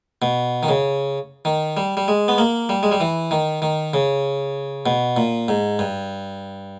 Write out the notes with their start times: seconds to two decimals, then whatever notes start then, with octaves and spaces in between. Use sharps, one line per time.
0.22 B2
0.63 D#3
0.68 C#3
1.45 D#3
1.77 G3
1.97 G3
2.08 G#3
2.28 B3
2.38 A#3
2.69 G3
2.83 G#3
2.92 G3
3.00 E3
3.31 D#3
3.62 D#3
3.94 C#3
4.86 B2
5.16 A#2
5.48 G#2
5.79 G2